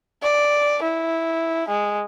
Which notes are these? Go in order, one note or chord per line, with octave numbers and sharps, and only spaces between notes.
D5
E4
G#3